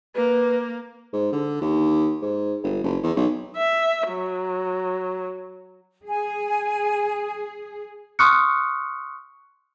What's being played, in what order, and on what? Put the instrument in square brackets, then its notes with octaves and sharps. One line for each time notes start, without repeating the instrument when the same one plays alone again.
[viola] A#3 [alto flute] B4
[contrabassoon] G#2
D3
D#2
G#2
G1
F#1
E2
B1
[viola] E5
F#3
[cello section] G#4 [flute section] G#5
[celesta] C6 C#6 D#6 F6 F#6 C#7